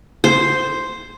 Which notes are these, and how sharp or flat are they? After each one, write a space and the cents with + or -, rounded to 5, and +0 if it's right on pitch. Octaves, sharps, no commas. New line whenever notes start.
C5 +0